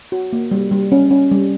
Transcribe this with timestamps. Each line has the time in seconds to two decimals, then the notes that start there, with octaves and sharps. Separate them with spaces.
0.12 F#4
0.33 A#3
0.51 G3
0.71 G3
0.92 C#4
1.11 C#4
1.31 G3